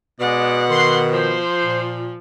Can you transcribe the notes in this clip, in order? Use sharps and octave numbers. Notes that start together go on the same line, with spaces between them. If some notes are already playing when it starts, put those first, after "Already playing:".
B2 G#3 D5 F#5
D#3 C6
F3 C5
A#2